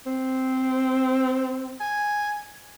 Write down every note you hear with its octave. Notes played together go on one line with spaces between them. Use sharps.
C4
G#5